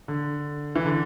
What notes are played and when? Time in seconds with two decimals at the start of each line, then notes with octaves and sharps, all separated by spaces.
0.08 D3
0.76 E3
0.86 D3